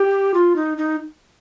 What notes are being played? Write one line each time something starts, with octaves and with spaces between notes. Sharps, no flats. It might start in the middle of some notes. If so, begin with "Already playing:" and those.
Already playing: G4
F4
D#4
D#4